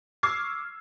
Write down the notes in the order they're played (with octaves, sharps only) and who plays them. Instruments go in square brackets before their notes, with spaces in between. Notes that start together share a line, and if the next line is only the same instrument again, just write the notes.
[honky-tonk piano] C#6 D6 E6 F6 G#6 C7